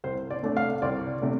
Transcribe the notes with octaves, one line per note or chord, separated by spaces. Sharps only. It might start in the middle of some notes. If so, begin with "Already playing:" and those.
C2 C5
D5
C3 A3 D4
F5
C2 D5
C3 A3 D4